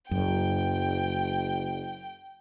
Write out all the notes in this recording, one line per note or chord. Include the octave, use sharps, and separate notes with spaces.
F#1 F#2 G5